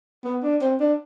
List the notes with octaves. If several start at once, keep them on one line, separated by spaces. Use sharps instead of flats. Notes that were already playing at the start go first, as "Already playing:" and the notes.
B3
D4
C4
D4